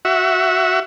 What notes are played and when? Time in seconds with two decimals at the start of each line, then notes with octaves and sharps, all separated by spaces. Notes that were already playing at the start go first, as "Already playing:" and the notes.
0.05 F#4 E5